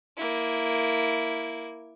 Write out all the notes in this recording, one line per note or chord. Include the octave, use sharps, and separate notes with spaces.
A#3 E4